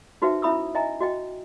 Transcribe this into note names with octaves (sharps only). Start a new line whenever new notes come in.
D#4 F#4 B4 C5 E5 G5
C#4 E4 E5 B5 D#6 E6
D#5 E5 G#5 A#5
F#4 D#5 G5